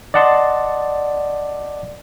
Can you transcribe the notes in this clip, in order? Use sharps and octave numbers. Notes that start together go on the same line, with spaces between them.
D5 D#5 F#5 A5 C6